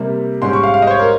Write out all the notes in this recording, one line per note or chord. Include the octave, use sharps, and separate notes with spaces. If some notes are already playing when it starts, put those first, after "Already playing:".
Already playing: C3 G3 A#3
G#2 G3 C#4 C6
C#6
F5
F5
D#5
C5
C#5
A#4